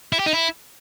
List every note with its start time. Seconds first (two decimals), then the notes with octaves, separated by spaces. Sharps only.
0.12 E4
0.19 G4
0.26 D#4
0.33 E4